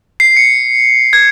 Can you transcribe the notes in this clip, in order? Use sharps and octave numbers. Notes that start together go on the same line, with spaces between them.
C7
C#7
G#6